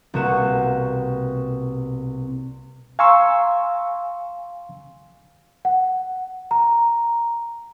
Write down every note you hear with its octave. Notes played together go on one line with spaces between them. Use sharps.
C2 B2 A#3 F#4 E7
F5 G#5 A#5 C6 C#6 E6
F#5
A#5